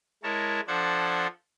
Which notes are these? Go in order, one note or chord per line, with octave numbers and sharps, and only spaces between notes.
G#3 E4 A#4 C#5 A5
F3 D4 A4 C5 F#5 G#6